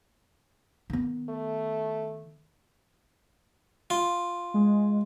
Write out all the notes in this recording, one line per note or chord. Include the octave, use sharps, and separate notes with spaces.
D#3 B3
A3
F4
G#3